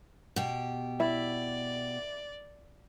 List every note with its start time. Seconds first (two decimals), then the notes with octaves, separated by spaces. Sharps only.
0.36 B2 G4
1.00 E4 D5 E5